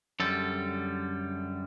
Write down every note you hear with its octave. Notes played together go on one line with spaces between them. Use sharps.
F#2 D3 G3 A4